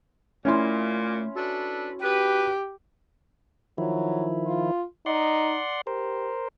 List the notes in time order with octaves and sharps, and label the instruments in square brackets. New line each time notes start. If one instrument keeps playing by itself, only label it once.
[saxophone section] A#2 [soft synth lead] A3 [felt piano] C#4 E4 C6
[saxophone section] D4 A4 B4 [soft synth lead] F#4
[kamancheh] G4 [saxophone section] B4
[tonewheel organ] D#3 F3 E4 [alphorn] F#3
[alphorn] F4
[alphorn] D#4 [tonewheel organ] D5 F#5 C6
[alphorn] G4 [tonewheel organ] A#4 C5